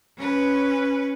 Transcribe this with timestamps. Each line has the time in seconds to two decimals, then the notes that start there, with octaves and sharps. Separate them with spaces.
0.17 C#4 B4